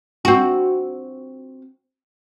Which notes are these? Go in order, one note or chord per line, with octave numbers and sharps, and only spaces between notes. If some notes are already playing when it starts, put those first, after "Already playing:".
C4 F#4